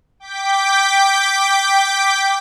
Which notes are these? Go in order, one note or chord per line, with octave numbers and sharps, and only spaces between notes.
G5 D6 G6 B6